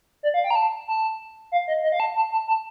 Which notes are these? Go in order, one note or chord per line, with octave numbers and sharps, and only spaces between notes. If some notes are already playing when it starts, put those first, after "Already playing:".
D5
F5
G5
A#5
A5
A5
F5
D#5
D#5
F5
A5
A5
A5
A5